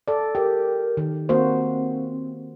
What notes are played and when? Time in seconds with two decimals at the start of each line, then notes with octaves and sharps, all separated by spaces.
0.08 A4 D5
0.35 G4 A#4
0.97 D#3
1.29 A#3 C4 F#4 C5